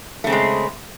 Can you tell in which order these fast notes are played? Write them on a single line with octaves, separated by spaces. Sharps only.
A3 C#3 C4 G#3